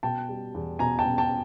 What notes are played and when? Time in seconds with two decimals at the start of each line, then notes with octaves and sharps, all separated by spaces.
0.03 B2 G5 A5
0.29 G3
0.54 E2
0.79 B2 G#5 A#5
0.99 G5 A5
1.05 B2
1.18 G5 A5